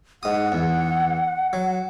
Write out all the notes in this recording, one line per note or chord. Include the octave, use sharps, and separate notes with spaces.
G#2 F#5 D#6
E2
F#3